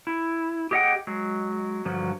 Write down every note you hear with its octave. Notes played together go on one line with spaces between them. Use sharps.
E4
G4 G#4 D#5 E5 F#5 G5
F#3 G#3
G2 D3 F3 F#3